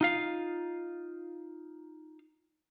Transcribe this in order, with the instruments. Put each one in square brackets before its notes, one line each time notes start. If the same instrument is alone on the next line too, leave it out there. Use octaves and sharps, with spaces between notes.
[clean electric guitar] D#4 F4 F5